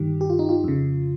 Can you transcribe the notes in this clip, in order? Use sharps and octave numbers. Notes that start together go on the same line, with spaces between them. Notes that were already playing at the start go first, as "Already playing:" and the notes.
Already playing: G2 D#3 G4
G4
F4
D#4
F4
F2 C#3